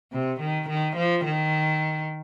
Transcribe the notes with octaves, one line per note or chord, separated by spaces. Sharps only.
C3
D#3
D#3
F3
D#3